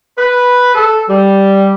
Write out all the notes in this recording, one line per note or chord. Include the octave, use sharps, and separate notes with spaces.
B4
A4
G3